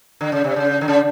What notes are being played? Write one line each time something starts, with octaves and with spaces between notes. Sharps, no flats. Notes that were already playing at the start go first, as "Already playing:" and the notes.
D3
C#3
C3
C#3
D3
C#3